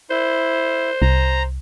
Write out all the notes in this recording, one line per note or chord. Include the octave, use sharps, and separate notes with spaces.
E4 C5
C2 A#5